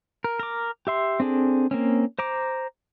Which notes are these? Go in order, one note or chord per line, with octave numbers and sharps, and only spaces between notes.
A#4
A#4 D6
G4 E5 C6
C4 D4 G#4 A4
A#3 C4 C#4
C5 A#5 D6